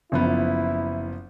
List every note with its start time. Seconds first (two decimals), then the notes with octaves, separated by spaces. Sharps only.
0.12 F#1 F3 B3 E4